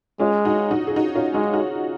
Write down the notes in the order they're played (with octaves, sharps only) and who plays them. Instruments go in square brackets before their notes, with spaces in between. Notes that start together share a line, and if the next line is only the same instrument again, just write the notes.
[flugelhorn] G#3 [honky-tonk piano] C#4 F4
[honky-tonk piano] D#4 F#4
D#4 F#4
G#4
D#4 F#4
C#4 F4
[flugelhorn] G#3 [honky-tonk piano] D#4 F#4
[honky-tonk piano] D#4 F#4